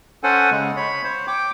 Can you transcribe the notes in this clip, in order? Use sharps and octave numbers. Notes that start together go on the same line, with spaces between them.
C#4 A4 C5 F#5 G#5
C#3 G#3
C#5 B5
C5 C#5
G5 D6